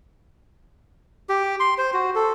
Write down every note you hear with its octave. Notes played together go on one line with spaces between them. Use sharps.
G4
C6
C5
F#4
A4